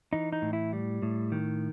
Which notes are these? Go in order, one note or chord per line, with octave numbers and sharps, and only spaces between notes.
E3 D#4
D#4
A2
E4
G3
A2
D#3